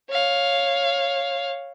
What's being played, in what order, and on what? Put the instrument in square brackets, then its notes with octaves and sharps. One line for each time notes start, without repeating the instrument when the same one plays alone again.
[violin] C#5 F5